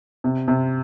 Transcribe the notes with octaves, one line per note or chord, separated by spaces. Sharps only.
C3
C3